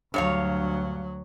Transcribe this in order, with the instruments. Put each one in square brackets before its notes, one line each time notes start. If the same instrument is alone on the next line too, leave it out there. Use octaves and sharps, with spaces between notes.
[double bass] D2 F#3 [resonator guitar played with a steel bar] G2 C#5 F5